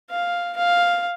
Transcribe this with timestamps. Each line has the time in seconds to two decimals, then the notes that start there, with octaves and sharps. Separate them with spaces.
0.10 F5
0.57 F5